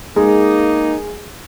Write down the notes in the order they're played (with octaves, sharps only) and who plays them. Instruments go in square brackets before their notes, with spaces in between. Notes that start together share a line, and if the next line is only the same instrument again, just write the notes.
[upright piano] G#3 [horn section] A#3 D#4